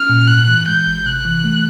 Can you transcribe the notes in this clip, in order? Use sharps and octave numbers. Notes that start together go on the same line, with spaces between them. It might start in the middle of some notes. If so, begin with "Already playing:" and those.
Already playing: C#4 F6
A#2
G#2 F#6
E3
G#3 G6
G#1
C3 F#6
E3
A3